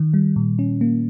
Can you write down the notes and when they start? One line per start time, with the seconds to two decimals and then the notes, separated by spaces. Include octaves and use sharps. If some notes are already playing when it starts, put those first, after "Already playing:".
Already playing: D#3
0.14 G3
0.36 A#2
0.59 C#4
0.81 A#3